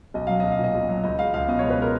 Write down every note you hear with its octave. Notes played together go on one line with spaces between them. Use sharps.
B1 D#5
F#3 F5
B1 D#5
F5
A#2
D#5
B1
F#3
C#2 D#5
G#3 F5
C#2 F5
B2 D#5
C#2 C#5
B4
G#3 A#4